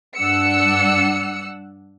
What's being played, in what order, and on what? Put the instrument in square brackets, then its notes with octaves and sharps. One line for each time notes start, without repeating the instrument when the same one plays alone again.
[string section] G2 D4 F#5 E6 C#7